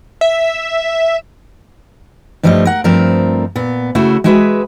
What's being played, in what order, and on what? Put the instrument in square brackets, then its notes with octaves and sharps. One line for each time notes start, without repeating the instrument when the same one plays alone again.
[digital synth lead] E5
[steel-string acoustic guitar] G2 F3 G3 A3 B4 D#5
A#4 F#5
G2 F3 A3 C4 A#4
A#2 B3
C#3 A3 E4 F#4
G#3 F#4 G#4 B4 E5